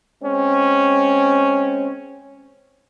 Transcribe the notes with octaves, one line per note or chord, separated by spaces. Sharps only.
G#3 C4 C#4